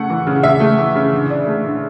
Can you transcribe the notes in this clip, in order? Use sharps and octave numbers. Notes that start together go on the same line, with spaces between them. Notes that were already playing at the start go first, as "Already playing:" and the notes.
Already playing: C#3 A3 F#5
E3
C#3
C#3 E5
A3
E3
C#3
D3
D4
A3
D3